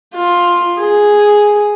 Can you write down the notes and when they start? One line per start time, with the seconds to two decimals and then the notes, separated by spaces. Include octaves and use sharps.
0.15 F4
0.80 G#4